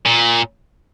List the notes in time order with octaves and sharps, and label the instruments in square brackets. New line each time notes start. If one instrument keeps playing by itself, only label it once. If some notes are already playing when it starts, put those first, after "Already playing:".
[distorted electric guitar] A#2